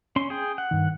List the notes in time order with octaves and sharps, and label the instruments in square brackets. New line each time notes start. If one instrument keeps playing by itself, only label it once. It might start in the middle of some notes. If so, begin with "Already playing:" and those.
[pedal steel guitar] C#4 C6
G#4 G5
F#5
[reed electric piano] G2 D#3